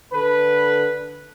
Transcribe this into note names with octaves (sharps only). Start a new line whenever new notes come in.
D3 A4 B4